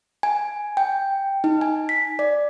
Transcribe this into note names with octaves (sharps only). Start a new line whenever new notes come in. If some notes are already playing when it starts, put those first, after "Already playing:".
G#5
G5
D#4
G#5
B6
D5